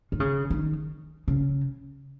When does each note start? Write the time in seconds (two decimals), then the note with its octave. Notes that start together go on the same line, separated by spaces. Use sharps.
0.12 D#3
0.20 C#3
0.50 D#3
1.28 C#3